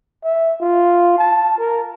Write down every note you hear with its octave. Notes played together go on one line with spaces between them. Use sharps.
E5
F4
A5
A#4